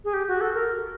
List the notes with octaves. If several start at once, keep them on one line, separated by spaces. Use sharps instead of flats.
G#4
G4
F#4
A4
A#4